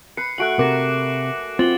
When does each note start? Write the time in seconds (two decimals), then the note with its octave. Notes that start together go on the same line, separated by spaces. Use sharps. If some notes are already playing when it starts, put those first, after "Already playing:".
0.17 B4 B5 C7 C#7
0.38 A3 F#4 G#5 F#6 D7 F#7
0.59 C3 A#4 D6 A#6
1.59 C4 F4 A6 F#7 G7